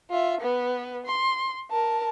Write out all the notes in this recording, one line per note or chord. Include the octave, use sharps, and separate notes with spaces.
F4 E5
B3 B4
C6
A#4 A5